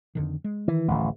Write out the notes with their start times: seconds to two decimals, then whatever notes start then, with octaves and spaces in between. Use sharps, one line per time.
0.15 F2 D3 D#3
0.44 G#3
0.68 D#3 E3
0.88 D1 A1